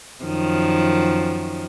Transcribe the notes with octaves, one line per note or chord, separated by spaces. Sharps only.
F#2 D#3 F3